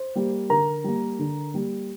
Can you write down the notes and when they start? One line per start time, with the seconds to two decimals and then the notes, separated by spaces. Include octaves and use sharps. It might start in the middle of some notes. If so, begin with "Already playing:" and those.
Already playing: C5
0.15 G3 A#3
0.50 D3 A#4 A#5
0.84 G3 A#3
1.19 D3
1.54 G3 A#3